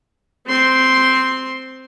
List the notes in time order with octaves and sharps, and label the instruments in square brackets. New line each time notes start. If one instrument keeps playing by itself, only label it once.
[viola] C4 C6